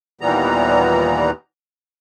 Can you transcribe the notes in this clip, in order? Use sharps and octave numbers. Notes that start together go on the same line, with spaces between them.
D#2 A#2 E3 G3 B3 A#5